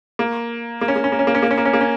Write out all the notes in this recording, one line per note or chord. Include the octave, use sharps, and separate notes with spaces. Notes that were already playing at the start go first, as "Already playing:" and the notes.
A#3
A#3
C#4
A#3
C#4
A#3
C#4
A#3
C#4
A#3
C#4
A#3
C#4
A#3
C#4